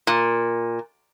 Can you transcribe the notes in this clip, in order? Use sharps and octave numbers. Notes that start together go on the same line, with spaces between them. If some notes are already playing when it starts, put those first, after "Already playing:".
A#2